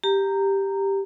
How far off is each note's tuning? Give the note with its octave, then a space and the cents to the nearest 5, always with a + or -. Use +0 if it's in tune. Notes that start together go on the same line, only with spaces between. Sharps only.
G4 +0 A#5 -10